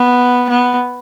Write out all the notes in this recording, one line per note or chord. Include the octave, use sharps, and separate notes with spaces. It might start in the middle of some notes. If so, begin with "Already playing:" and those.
Already playing: B3
B3